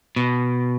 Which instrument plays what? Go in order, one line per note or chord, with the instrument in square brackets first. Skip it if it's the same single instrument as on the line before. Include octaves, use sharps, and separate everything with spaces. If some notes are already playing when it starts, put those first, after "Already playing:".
[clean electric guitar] B2